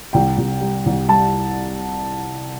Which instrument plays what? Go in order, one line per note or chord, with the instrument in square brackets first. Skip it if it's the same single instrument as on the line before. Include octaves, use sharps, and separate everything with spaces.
[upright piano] C2 G5
C2
G3
C2
G3 A5